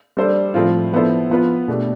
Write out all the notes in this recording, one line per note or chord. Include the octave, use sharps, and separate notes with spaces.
G3 D4 A4 C5
A2 F3 C4 F4
F3 B3 E4 A4 C5
F3 B3 F4 B4
B2 A3 D4 G4